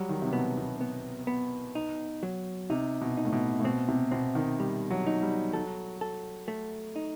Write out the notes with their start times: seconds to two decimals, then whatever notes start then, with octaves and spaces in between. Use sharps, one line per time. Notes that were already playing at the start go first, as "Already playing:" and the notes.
Already playing: F#3 G3
0.09 D#3
0.22 C3
0.33 B2 B3
0.57 B2
0.81 B3
1.27 B3
1.75 D#4
2.23 F#3
2.70 C3 D#4
3.01 B2
3.17 D#4
3.25 A2
3.33 B2
3.59 A2
3.64 B2 C4
3.88 C3
4.11 B2 C4
4.35 D#3
4.60 G3
4.90 F#3
5.07 D#4
5.22 G3
5.53 F#3 A4
6.01 A4
6.48 A3
6.96 D#4